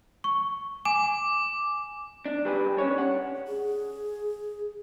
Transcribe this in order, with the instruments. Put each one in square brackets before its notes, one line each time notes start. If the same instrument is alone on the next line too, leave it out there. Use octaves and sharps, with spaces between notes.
[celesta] C#6
[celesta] G#5 [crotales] D6
[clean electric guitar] D4
G3 G4 G#4 B4
C#4 D4 C#5
F#5
[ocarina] G#4